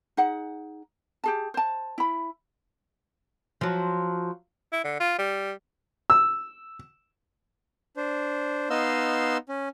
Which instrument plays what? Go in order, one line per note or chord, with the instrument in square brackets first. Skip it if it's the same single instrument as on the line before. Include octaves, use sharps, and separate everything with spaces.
[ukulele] D#4 G#4 F#5
G4 G#4 A5
C5 A5
E4 B5
[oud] F3 F#3
[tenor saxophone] E4
D3
F4
G3
[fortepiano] E6
[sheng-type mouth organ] D4 C5
B3 D#4 D#5 F5 C6 E6
C#4